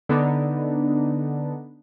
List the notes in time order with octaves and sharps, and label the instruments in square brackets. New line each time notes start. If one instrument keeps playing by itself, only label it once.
[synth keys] D3 B3 D4 D#4